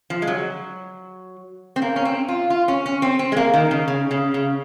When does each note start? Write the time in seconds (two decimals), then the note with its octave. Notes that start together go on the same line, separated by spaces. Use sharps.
0.10 F3
0.22 G#3
0.28 F#3
1.76 C4
1.82 A#3
1.96 C#4
2.05 C4
2.28 F4
2.50 F4
2.68 C#4
2.86 C#4
3.02 C4
3.19 C4
3.32 G#3
3.37 A#3
3.54 D#3
3.71 C#3
3.88 C#3
4.11 C#3
4.34 C#3